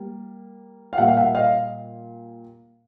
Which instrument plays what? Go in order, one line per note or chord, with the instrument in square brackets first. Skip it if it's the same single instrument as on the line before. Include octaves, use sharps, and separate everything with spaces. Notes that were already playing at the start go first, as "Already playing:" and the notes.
Already playing: [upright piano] G3 A#3
F5
A#2 G3 A#3 E5 F#5
F5
E5 F#5
D#5 F5